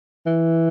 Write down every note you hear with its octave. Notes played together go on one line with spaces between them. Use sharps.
E3